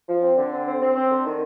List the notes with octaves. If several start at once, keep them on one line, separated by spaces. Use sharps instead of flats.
F3
C4
D3
C4
C4
C4
C4
D3
D#3